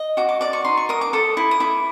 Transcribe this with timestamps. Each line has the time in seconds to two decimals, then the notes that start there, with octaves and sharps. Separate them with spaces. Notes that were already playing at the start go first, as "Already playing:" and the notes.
Already playing: D#5
0.17 F#4 D6
0.29 D6
0.41 D5 D6
0.53 C#6
0.64 D#4 C6
0.77 C#6
0.89 A#4 D#6
1.01 D6
1.13 A4 D#6
1.37 E4
1.51 D#6
1.60 E4 D6